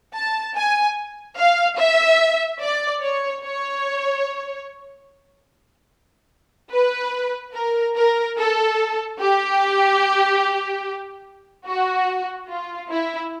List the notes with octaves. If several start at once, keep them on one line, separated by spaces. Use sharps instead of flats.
A5
G#5
F5
E5
D5
C#5
C#5
B4
A#4
A#4
A4
G4
F#4
F4
E4